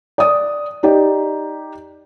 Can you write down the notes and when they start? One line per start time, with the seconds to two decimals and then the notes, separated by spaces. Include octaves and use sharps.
0.18 D5 D#6
0.83 D#4 G4 D5